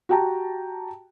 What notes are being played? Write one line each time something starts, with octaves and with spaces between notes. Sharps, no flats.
F#4 G4 G5 A5 A#5